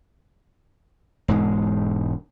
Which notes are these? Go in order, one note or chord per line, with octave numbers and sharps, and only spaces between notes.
E1 G#2 G#3